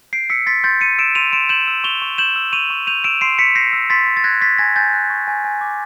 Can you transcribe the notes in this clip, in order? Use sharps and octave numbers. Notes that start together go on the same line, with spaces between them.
G6 C7 D7
E6 B6 C#7
C6 A6 B6
C6 G6 A6
G6 C#7 D#7
E6 D7 E7
C6 D#7 F7
C6 D7 E7
G6 E7 F#7
E6
C#6 F7 G7
C#6
G6 E7 F#7
E6
C#6 D#7 F7
C#6
G6 D#7 F7
E6 D7 E7
C6 C7 D7
C6 B6 C#7
G6 A#6 C7
E6
C6 A6 B6
C6
A6
F#6 G#6 A#6
C#6 A6 B6
G#5 G#6 A#6
G#5 G6 A6
F#6
C#6
G#5
G#5
D6